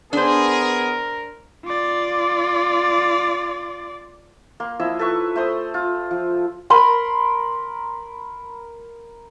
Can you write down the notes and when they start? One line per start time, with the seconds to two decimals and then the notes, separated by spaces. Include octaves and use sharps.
0.13 B3 D4 G#4 A#4 C5
1.65 F4 D5
4.60 A#3 C6
4.80 F3 E4 D#5 E6
4.99 A4 B4 E5 C#6
5.35 A3 C5 C6 D#6
5.74 F4
6.11 F3
6.70 A#4 B5 C6